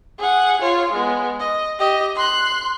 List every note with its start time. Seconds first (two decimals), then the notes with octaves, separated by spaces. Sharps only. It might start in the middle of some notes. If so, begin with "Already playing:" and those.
0.19 G#4 F#5
0.61 F4 C#5
0.93 G#3 B3
1.40 D#5
1.79 G4 D#5
2.15 C6 F#6